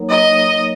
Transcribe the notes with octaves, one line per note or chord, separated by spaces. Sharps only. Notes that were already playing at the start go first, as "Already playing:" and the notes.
Already playing: F#3 A#3 D#4 A#4 C#5
D#5